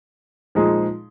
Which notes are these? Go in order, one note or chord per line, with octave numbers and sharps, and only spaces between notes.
A#2 F3 G#3 D#4 G#4